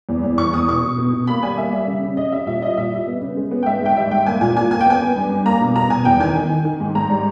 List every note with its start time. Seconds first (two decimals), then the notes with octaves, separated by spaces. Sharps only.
0.09 E2
0.23 E2
0.38 E2 C#6
0.53 E2 D#6
0.68 B2 C#6
0.83 B2
0.98 B2
1.13 B2
1.27 A#3 B5
1.43 G3 G#5
1.58 A#3 E5
1.73 G3
1.87 C#3
2.03 C#3
2.17 C#3 D#5
2.32 G3 E5
2.47 A#2 E5
2.62 G3 D#5
2.77 A#2 E5
2.92 G3
3.07 B3
3.22 C#3
3.37 G#3
3.51 B3
3.63 G5
3.66 G#2 E5
3.82 G#2 G5
3.97 G3 E5
4.11 G#2 G5
4.26 A#3 G#5
4.41 A#2 G#5
4.56 A#3 G#5
4.71 A#3 G#5
4.81 G5
4.86 B3 G#5
5.01 B3
5.16 G2
5.31 G2
5.45 A#3 A#5
5.61 B2
5.75 B2 A#5
5.90 B2 G#5
6.05 E2 G5
6.20 D#3 G#5
6.35 D#3
6.50 D#3
6.65 D#3
6.80 G#2
6.95 G#2 A#5
7.09 G3